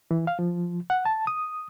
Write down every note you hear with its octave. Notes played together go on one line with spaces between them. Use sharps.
E3
F5
F3
F#5
A5
D#6